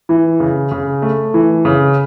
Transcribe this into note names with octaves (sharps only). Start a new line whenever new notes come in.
E3
C#3
C#3
A3
E3
C#3